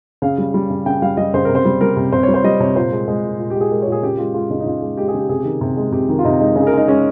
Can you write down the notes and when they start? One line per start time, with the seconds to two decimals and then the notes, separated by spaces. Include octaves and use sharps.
0.22 C#3 F5
0.38 G3
0.54 G3
0.70 C#3
0.86 C#3 G5
1.02 G3 F5
1.17 G3 D#5
1.34 C#3 C5
1.45 C3 A#4
1.55 C5
1.65 G3
1.81 G3 A#4
1.97 C3
2.13 C3 C5
2.23 C#5
2.28 G3
2.34 C5
2.44 G3 D#5
2.60 C3 C#5
2.76 A#2 C5
2.92 G#3
3.08 G#3
3.23 A#2
3.39 A#2
3.50 G4
3.55 G#3
3.61 G#4
3.71 G#3 A#4
3.82 C#5
3.87 A#2 G#4
4.03 C#3 G4
4.18 G#3 F4
4.34 G#3 F4
4.50 C#3 D#4
4.60 D#4
4.66 C#3 F4
4.82 G#3
4.97 G#3 G4
5.08 G#4
5.14 C#3 G4
5.29 C3 G#4
5.39 G4
5.45 D#3
5.61 C3
5.77 G#3
5.92 C3 G4
6.09 D#3
6.19 F4
6.24 C3 D#4
6.40 G#3 D#4
6.56 C#3 D#4
6.62 G#4
6.67 A#4
6.72 G#3
6.77 D#4
6.88 G#3 C#4